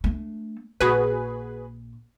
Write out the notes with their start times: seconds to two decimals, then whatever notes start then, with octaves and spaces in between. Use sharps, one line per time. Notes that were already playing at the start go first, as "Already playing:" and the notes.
0.04 A3 D4
0.81 A#1 F#4 G#4 B4